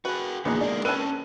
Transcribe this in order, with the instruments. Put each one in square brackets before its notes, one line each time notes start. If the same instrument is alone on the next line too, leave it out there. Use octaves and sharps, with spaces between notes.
[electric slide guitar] F#4 G#4 [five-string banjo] B4
[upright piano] A#1 [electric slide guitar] D3 E3 [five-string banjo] B3 D#4 G#4
[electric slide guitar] G#3 A#3 [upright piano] D4
[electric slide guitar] C4 C#4 [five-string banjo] B4 A5 [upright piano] E6 D#7